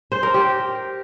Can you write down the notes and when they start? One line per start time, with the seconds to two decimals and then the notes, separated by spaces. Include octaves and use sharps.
0.12 C5
0.23 A#4
0.34 G4